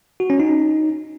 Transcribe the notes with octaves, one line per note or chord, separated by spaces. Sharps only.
F#4
C#4
D#4